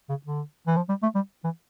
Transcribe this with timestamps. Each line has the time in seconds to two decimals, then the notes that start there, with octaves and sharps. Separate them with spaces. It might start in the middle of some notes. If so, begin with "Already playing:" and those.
0.09 C#3
0.26 D3
0.67 E3
0.76 F3
0.89 G3
1.03 A3
1.15 G3
1.44 E3